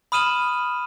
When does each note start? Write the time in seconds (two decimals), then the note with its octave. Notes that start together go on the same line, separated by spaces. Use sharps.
0.12 B5 D#6 F6 D#7 E7 F#7